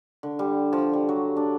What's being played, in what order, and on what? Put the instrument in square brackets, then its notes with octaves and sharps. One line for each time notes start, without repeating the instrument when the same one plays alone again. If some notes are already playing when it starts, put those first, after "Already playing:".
[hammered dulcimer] D3
G3
F3
G3
F#3
D4